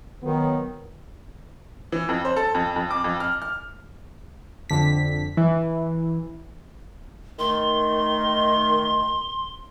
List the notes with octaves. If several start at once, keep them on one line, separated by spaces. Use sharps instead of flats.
D#3 F#3 B3
E3
F2
C5
A4
F2
F2
D6
F2
F6
F6
F2 D3 B6
E3
D#3 A3 C6